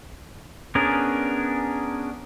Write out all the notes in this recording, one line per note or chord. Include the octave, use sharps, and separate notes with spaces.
B3 C#4 D4 G#4 A#4